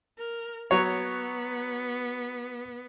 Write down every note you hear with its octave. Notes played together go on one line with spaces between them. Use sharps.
A#4
F#3 B3 C#5